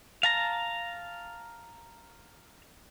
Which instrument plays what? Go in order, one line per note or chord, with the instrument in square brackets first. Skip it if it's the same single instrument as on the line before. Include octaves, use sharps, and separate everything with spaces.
[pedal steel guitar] F5 A5 A#5